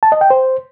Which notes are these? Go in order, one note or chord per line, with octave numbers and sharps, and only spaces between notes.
A5
D#5
G5
C5